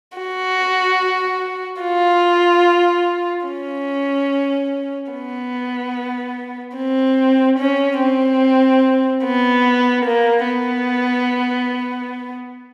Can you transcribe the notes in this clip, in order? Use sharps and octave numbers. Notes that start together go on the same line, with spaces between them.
F#4
F4
C#4
B3
C4
C#4
C4
B3
A#3
B3